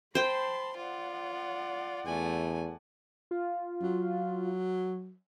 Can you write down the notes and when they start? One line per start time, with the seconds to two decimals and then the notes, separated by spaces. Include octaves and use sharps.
0.15 C5 G5 A5 B5 C6
0.77 F4 D5 F#5
2.06 E2 A3 G#5
3.31 F4
3.82 F#3